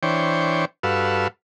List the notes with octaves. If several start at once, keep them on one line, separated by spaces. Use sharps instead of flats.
E3 D4 C5 C#5 G5
G2 F#4 A4 B4 F5 E6